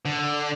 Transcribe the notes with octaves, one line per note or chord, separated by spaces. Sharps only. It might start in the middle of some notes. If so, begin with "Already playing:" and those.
D3